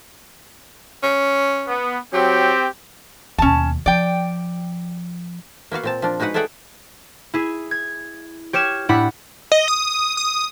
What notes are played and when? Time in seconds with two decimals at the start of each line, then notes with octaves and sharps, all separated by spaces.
1.03 C#4
1.68 B3
2.13 F#3 C4 G4
3.38 D#2 B2 C#4 A5
3.86 F3 D5 G5
5.71 A#3 B3 F#4 F5
5.83 A#2 C4 A5
6.02 F3 D4
6.19 G#3 D#4 F#4 B4 F#5
6.34 A3 G#4 D5 E5 F#5 G5
7.34 E4 G#4
7.71 G#6
8.53 G4 C#5 F6 G#6 E7
8.89 A2 D4 E4 G4 F#5 B5
9.52 D#5
9.68 D#6
10.17 D#6